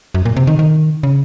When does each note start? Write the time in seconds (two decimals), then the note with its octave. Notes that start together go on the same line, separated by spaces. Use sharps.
0.15 F#2
0.25 A#2
0.37 C3
0.47 D#3
0.59 D#3
1.03 C#3